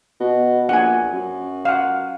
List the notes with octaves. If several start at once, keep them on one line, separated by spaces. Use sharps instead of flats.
B2
A#1 F#5 G#5
F#2
F5 F#5